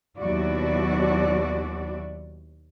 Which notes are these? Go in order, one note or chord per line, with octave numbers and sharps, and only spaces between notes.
D#2 B2 F#3 E4 F#4 D5